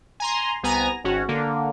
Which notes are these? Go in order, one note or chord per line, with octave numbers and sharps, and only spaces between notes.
G#5 A#5 C6
C2 B3 G#5 A#5 A#6
G#1 C#4 F#4
D3 A#3